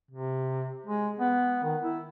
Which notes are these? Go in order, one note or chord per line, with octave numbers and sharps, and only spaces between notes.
C3
G#3
B3
D#3
E4